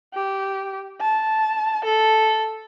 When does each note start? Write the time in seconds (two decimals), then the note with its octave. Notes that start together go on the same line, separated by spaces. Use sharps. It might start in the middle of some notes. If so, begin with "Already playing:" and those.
0.14 G4
1.01 A5
1.85 A4